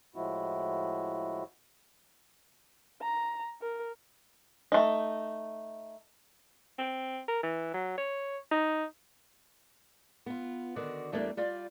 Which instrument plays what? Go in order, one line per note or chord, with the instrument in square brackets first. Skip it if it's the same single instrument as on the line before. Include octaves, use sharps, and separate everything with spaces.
[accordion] A2 F3 G#3 E4 F#4
[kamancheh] A#5
A#4
[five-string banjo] A3 D#4
[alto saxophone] C4
A#4
E3
F#3
C#5
D#4
[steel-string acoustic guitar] B3 F4
D3 D#3 F#4 D5
E2 G3 A3 A#3 C4 D4
G3 F4 D5